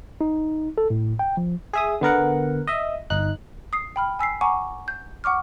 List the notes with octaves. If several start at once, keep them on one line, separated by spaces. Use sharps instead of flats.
D#4
A4
A2
G5
F3
G#4 E5 D#6
D3 B3 A#4 F#5
D#5 E5
G1 D#4 F#6
D#6 C7
G5 B5 F6
G#5 E6 B6 C7
F#5 G#5 A#5 C#6 D6
G6
F#5 C#6 D6 F6